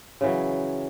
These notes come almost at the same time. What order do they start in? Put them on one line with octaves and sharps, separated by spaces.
C#3 E3 F#3